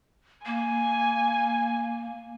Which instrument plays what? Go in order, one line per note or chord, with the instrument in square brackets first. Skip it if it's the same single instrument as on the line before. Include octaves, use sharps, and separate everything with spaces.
[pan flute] A#3 [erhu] G#5